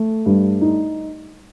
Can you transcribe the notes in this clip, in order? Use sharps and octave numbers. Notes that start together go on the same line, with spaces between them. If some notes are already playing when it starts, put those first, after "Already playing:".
Already playing: A3
G2
D#4